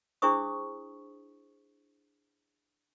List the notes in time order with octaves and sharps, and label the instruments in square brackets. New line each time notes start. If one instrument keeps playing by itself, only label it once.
[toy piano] D4 E4 G#4 C5 C#6 D#6